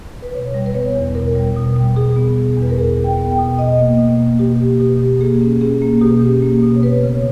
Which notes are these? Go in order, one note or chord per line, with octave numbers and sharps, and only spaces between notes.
B4
B2 C#5
G3
B4
B3 C#5
E2
B2 A#4
G3
B2
G3
B2 G#4
B3
B2
E2 B4
A#4
E2 G#4
E2
G5
B3
G5
B2
B2 D#5
A#3
B2
A#3
B2 G4
A#3
B2 G4
B2
A#3 G#4
C#4
C#4 G#4
A#3
B2 G4
C#4
A#3
B2
C#5
B3 B4
C#3 C#5